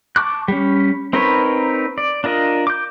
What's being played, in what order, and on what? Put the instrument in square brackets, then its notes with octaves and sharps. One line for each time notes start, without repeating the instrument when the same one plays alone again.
[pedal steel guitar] A5 C#6 D6 F#6
G3 C#4
C4 D#4 A#4 B4 C#5
D5
D4 F4 A#4 D#5
D6 G6